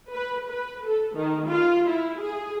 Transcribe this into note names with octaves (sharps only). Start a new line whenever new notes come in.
B4
B4
A4
D#3
F4
E4
G#4